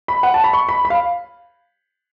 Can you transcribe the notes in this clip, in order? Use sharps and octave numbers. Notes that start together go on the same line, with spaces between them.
B5
F#5
A5
B5
C#6
B5
B5
F5